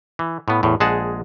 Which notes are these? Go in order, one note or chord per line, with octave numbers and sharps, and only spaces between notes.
E3
A2 B3
E2 A2
A#1 G#3 G#4 F#5 A5